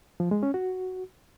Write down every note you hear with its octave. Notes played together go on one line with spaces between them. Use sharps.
F3
G#3
C#4
F#4